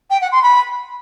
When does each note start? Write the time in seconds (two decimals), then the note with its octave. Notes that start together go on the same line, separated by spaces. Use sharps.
0.10 G5
0.21 F#5
0.32 C6
0.43 B5